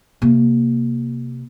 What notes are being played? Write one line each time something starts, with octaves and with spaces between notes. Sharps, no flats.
C3 A#3